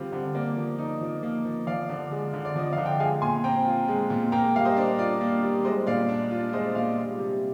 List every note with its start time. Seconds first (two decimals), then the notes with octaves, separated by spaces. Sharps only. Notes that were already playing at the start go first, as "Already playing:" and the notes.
Already playing: D3 G3 C4 F4
0.12 D3
0.34 A#3 D5
0.57 F3
0.79 D#4
1.01 F3
1.23 A#3
1.45 F3
1.67 F3 D5 F5
1.89 D3
2.11 G#3
2.33 D3
2.45 D5
2.55 F3 D#5
2.73 F5
2.78 D3
2.86 G5
2.99 G#3 F5 G#5
3.22 A#2 G#5 C6
3.44 C4 G5 A#5
3.66 F4
3.88 G#3
4.10 A#2
4.32 A#3 G5 A#5
4.54 G3 F5
4.65 C5 D#5
4.77 D4
4.98 F4 D5
5.21 A#3
5.43 G3
5.65 G#3 C5 D#5
5.87 A#2 D5 F5
6.09 D4
6.31 F4
6.53 G#3 C5 D#5
6.75 A#2 D5 F5
6.97 G3
7.19 C3